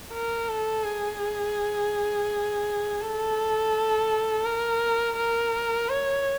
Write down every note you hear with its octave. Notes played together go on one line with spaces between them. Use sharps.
A#4
A4
G#4
A4
A#4
A#4
C#5